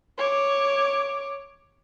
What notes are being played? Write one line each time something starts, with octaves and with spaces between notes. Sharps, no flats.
C#5 D6